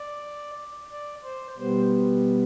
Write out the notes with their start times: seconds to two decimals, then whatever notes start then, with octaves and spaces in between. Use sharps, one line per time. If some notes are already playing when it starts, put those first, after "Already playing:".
Already playing: D5
0.91 D5
1.24 C5
1.58 B2 G3 B3 C5